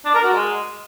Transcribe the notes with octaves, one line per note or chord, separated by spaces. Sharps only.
D4
A#4
F#4
G#3